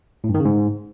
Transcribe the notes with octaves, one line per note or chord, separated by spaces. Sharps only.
A2
G2
D#3
C#3
G#2